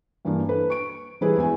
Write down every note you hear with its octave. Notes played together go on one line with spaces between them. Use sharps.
G2 E3 A#3 D4
A4 B4
C#6 D7
E3 G3 G#3 E4 G#4 B4
E2 E5 G#5